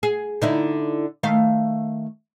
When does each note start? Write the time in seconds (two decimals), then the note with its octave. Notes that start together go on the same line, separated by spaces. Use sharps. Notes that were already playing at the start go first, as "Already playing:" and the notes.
0.03 G#4
0.42 D3 D#4 E4
1.23 D#3 A3 F5